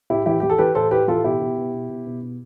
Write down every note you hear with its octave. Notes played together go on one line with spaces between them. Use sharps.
A2 E4 G4
E3 E4 G4
E3 G4
A4
E3 G4 B4
A2 A4 C5
A2 G4 B4
E3 F4 A4
B2 E4 G4
B2
B2
B2
B2
B2
B2